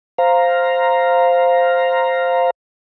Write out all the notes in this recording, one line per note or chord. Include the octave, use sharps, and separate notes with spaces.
C5 F5 A#5